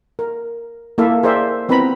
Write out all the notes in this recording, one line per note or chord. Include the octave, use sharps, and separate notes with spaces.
A#4
A#3 E4 A4 E5 F5
G#4 A#4 C5 D5 E5
B3 C4 E4 B4 A#5 B5